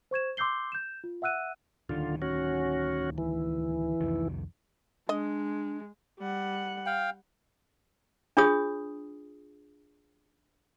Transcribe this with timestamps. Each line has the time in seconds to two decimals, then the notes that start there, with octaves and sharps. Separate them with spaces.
0.11 C5 C#6 G#6 E7
0.37 C6 D6 E6 G6 C7 G7
0.72 G6 E7
1.04 F4
1.22 E5 F#5 E6 F#6 D#7
1.89 D1 D3 D#3 F4
2.22 C#4 F#4
3.18 E3
4.01 C2 F2 D#3
5.09 G#3 D4 D#5
6.20 G3 F#5
6.86 F5 G5
8.37 D4 F4 G#4 C#5 D#6